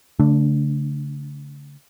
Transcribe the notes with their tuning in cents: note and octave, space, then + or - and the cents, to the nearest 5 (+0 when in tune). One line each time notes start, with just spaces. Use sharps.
D3 -45 A3 +0 D4 +0